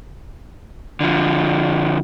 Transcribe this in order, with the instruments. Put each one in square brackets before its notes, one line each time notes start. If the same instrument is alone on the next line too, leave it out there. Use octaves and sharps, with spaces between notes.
[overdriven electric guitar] D3 F3